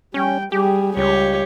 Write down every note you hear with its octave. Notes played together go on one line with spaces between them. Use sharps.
G3 C#4 G5
G3 G4 G#4
C#2 G3 G4 C#5